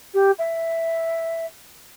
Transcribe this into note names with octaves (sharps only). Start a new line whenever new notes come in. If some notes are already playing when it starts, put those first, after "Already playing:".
G4
E5